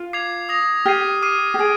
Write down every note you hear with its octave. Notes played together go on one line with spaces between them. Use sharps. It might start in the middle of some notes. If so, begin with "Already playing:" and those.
Already playing: F4
D6 G#6 C7 F7
D#6 A#6 F7
G4 F6 G#6 C7 D#7
D6 F6 C7 D#7
G4
G#4 D#6 G#6 D7